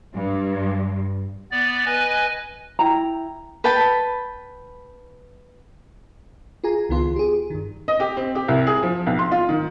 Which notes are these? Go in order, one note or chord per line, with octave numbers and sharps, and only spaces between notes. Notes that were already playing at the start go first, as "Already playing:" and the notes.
G2
B3 D5
B4 D#5 G#5
E4 G5 A#5
B4 G5 A5 B5
F4 G#4 G#5 A#5
C#2 D#3 B3 F4 C6
G4 G#4
G2 D#3
D#5
G4
C4
G4
C2
G#4
F3
B1
C6
F4
D#3